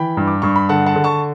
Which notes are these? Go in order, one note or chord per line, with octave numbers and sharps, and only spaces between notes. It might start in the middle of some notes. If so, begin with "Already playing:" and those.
Already playing: E3 G5 B5
G2
D6
G2 C#6
B5
D3 F#5 A5
F#5 A5
D3
A5 C#6